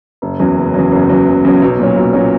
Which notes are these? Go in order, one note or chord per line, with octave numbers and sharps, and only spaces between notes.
F#1
E2 C#3 F#3
F#1
E2 C#3 F#3
F#1
E2 C#3 F#3
F#1
E2 C#3 F#3
B1
A#2 F#3 C#4
B1
A#2 F#3 C#4